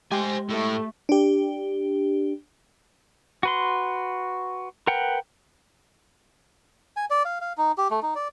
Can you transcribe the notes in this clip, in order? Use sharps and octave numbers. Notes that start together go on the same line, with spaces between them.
G#3 G4 C5 G#5
A2 A3
D4 G4
F#4 B4 C6
A#4 B4 F#5 G5
G#5
D5
F5
F5
D#4
G4
A3
D#4
D5